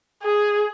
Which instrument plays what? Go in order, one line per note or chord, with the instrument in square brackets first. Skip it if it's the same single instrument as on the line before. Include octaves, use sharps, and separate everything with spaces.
[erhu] G#4